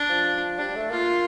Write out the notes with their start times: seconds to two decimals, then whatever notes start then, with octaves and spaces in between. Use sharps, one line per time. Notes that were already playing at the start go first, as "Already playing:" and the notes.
Already playing: D4
0.09 F3
0.59 G3 D4
0.75 A3
0.91 A#3 F4